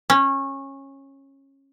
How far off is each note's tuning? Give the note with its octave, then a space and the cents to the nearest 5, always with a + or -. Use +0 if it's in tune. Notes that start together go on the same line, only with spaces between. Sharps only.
C#4 -20